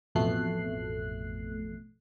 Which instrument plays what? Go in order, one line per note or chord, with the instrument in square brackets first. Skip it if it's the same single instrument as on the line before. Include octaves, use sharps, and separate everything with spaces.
[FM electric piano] A1 F2 B2 A3 F#6 C7